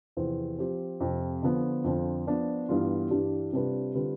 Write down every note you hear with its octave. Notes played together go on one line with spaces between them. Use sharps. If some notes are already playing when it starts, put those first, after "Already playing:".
E2 C3 F3 C4
F3 C4 G4
F2 C3 F3
D3 F3 B3
F2 D3 F3
F3 B3 D4
G2 E3 G3 B3 F4
G2 E3 G3 D4 G4
C3 G3 D4 F4 B4
D3 G3 C4 F4 B4